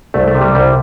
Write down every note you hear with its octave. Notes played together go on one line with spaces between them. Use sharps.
C2 A3
A3
C3
G3
C2 G3